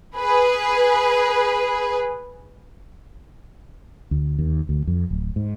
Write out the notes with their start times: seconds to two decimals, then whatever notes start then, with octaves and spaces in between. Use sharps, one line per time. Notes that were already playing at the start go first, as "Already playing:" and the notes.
0.16 G#4 B4
4.11 D2
4.38 D#2
4.69 D2
4.87 F2
5.11 D1
5.36 G#2